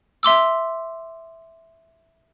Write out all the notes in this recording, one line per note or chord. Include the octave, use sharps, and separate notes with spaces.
E5 C6 D6 E6